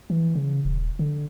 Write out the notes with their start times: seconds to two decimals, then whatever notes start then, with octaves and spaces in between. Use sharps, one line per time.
0.10 E3
0.35 C#3
0.65 D#1
0.99 D3